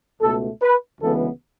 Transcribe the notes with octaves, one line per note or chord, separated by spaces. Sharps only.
C#2 B2 A3 A4
B4
D2 C#3 E3 G#3 B3 A4